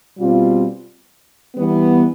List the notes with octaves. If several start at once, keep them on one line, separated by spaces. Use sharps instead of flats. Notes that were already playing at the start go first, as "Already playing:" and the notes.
B2 G3 C4 F4
E3 G3 B3